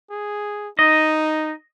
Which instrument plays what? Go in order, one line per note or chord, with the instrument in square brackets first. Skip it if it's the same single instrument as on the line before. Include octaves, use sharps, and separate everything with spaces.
[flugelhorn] G#4
[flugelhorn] D#4 [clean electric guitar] D#5